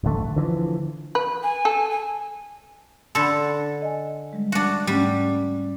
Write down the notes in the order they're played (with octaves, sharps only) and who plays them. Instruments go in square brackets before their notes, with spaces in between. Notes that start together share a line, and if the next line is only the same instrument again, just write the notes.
[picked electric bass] D1 A1 D3 A3
D3 E3 F3
[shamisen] B4
[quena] G#5
[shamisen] A4
[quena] G#5
[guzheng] D3 A4 [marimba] B5 C6
[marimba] D#5 G#5
G3 G#3
[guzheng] D4 F#4
[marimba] G#2 A3 C#4 [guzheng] G3